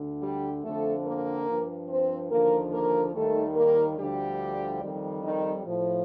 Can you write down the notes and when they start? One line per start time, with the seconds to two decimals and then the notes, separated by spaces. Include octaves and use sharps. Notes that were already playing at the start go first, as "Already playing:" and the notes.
Already playing: D2 D3
0.21 G3 G4
0.64 F2 D3 F3 A3 A4
1.06 A#3 A#4
1.48 G2 F3
1.89 C4 C5
2.31 D#2 D3 F3 A#3 A#4
2.72 A#3 A#4
3.14 D#2 D#3 G3 A3 A4
3.56 A#3 A#4
3.98 D2 D3 F3 G3 G4
4.82 F2 D#3 G3
5.24 D#3 D#4
5.65 A2 F3